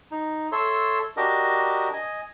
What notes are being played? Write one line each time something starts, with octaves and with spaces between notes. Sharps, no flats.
D#4
A4 C#5 E5 C6
D4 F#4 G4 A#4 D#5
D#5 G#5